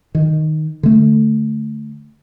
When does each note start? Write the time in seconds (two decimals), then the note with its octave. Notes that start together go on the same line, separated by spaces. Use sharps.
0.15 D#3
0.83 D3 A3